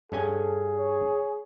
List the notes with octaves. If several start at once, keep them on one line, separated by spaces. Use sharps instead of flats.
G2 C#4 G#4 A4 G#5
C#5